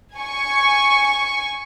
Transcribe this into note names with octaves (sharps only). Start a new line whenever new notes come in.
G#5 C#6